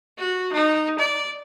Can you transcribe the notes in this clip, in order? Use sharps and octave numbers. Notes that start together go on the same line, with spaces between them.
F#4
D#4
D5